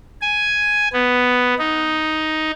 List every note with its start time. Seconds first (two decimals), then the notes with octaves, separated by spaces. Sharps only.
0.22 G#5
0.93 B3
1.59 D#4